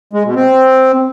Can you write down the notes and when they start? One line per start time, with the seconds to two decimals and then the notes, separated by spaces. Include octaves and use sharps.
0.13 G#3
0.24 B2
0.36 C4